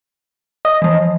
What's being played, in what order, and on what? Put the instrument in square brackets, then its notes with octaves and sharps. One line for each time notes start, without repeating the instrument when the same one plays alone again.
[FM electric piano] D#5
[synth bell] E3 F3